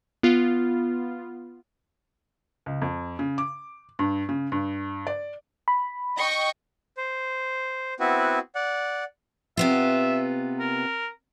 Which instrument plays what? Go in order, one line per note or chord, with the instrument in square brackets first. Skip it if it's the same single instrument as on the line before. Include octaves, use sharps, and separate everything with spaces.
[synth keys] B3 F4
[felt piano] C#2
F2
C#3
D6
G2
C#3
G2
D5
[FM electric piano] B5
[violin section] D#5 G5 C#6
[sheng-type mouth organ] C5
B3 C4 E4 F#4 B4
D5 F#5
[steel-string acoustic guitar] C3 B3 F4 [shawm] E5
[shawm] A#4